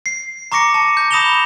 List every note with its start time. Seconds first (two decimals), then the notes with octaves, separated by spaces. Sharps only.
0.06 C7
0.52 A#5 C#6 D6 A#6 C#7
0.74 A5
0.97 G6
1.11 B5 D#6 A#6 E7 F7 G7